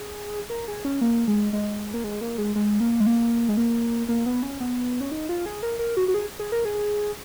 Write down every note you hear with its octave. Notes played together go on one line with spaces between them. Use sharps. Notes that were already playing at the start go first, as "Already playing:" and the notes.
Already playing: G#4
A#4
G#4
C#4
A#3
G#3
G#3
A#3
G#3
A#3
G#3
G#3
A#3
G#3
A#3
G#3
A#3
A#3
B3
C#4
B3
C#4
D#4
F4
G#4
A#4
A#4
F#4
F#4
G#4
G#4
A#4
G#4